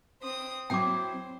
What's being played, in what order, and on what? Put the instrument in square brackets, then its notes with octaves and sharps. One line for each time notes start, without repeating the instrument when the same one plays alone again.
[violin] C4 D#6
[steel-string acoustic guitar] F#3 C4 E4 [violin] C5 [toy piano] G5 D6